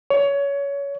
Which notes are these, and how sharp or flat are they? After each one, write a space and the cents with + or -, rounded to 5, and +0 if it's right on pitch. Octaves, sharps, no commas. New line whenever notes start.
C#5 +20